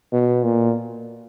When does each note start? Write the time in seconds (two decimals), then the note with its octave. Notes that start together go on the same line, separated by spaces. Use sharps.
0.13 B2
0.44 A#2